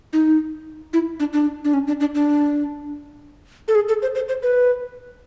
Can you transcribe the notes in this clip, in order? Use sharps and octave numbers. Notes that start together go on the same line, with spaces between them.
D#4
E4
D4
D4
D4
C#4
D4
D4
D4
A4
G#4
A4
C5
C5
C5
B4